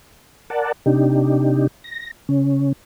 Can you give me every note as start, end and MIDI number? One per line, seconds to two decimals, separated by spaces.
0.50 0.72 70
0.50 0.72 74
0.50 0.72 78
0.50 0.72 81
0.86 1.67 48
0.86 1.67 62
0.86 1.67 63
0.86 1.67 67
1.84 2.11 94
2.29 2.72 49
2.29 2.72 61